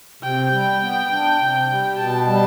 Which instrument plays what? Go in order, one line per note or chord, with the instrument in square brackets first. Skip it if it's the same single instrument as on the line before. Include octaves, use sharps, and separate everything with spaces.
[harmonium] C3 [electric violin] G5
[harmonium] G3
B3
D4
C3
G3
[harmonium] B2 [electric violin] A5
[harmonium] G3